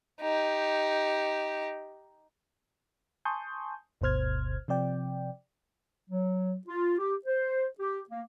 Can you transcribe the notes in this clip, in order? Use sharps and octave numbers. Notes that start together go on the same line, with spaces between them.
D#4 G4
G#5 A5 C6 C#6 D#6 G6
G1 D2 B2 C5 F6 G#6
C3 F3 C4 D5 G5
F#3
F4
G4
C5
G4
A#3